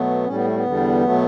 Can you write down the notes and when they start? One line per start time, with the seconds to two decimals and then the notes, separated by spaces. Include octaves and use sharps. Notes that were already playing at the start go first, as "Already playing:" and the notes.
Already playing: B2 F#3 A3 B3
0.26 A2 G3 C#4
0.35 B3
0.45 A3
0.55 B3
0.65 E2 D3 G3
1.04 B2 F#3 A3